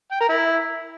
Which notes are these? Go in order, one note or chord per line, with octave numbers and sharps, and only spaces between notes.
G5
A#4
E4